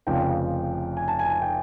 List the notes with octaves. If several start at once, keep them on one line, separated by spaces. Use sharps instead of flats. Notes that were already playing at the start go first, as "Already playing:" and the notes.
F1 F2 C#3 F3 G5
G#5
A5
G#5
A5
G#5
G5